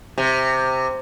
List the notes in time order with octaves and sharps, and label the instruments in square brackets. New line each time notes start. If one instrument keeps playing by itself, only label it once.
[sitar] C3